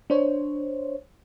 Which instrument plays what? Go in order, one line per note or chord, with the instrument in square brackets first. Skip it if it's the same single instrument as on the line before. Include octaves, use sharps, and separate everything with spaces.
[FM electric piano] D4 C5 C#5